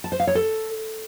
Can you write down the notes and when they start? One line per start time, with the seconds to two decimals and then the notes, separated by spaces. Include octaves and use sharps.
0.04 A5
0.12 C5
0.20 F5
0.27 C#5
0.35 A4